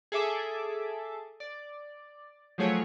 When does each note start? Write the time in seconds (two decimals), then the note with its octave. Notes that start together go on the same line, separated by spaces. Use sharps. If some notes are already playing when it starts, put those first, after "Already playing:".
0.12 G#4 A4 E5 D6
1.40 D5
2.58 F3 F#3 A3 G#4 C#5